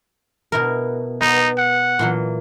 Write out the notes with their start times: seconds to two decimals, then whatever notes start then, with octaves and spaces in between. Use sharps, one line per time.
0.52 B2 E4 A#4
1.21 B3 D#4
1.58 F#5
1.99 A#2 E3 F#3